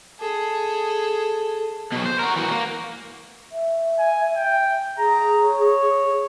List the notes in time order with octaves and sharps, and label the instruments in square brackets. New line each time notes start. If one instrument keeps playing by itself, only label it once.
[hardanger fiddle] G#4 A4
[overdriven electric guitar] B2 F#3
C5
F#4 A#4
E3 F#4
A#3
[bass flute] E5
[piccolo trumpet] G#5
G5
[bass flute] G#4 [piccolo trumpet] A#5
[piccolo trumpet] C#5